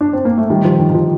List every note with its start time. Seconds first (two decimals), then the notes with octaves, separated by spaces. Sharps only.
0.01 D4
0.13 C4
0.25 A#3
0.38 A3
0.50 D#3 G3
0.65 F3
0.79 D#3
0.89 D#3
0.94 F3